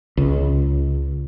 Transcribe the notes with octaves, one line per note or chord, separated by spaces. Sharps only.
C#2